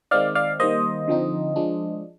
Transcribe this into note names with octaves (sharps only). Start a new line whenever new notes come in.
D#3 G#3 C4 D#4 D5 F5
D5 F5
D#3 G3 A#3 C5 D#5
D3 F3 C4 D#4
F3 G#3 D4